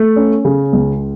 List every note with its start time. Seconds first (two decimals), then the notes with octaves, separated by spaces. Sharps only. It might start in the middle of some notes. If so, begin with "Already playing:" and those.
Already playing: A3
0.16 C#4
0.45 C#3
0.73 C#2